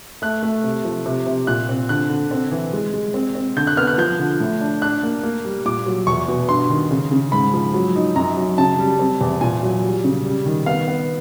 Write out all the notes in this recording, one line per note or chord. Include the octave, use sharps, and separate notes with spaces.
A3 F#6
A3
C3
F3
C3
C3
A#2 F#6
C4
D3 F#6
D3
C4
E3
G#3
G#3
C4
C4
D3 G6
F#6
B3 F6
F#6
F3 G6
D3
A2
D4
D4 F#6
A#3
A#3
G3
A#2 D6
F#3
E2 C#6
B2
G2 C6
D#3
C#3
C#3
G#2 B5
F3
F#3
D#4
F#2 A#5
F#3
C#3 A5
G3
C4
E2
A#2 G#5
F#3
G3
C#3
G3
D#3
B3 F5
B3